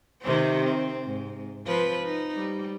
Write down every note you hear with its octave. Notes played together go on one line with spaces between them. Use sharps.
C3 D#3 C4
C4
G#2
F3 C4 B4
D#4
G3